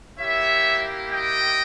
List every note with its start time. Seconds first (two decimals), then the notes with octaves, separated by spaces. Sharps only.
0.19 A#3 E4 G4 C#5 E5
1.12 D#5 G5